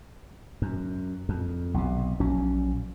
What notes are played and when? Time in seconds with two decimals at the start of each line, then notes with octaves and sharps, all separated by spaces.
0.62 F#2
1.29 F2
1.74 B1 C3
2.20 A#1 F#3 C#4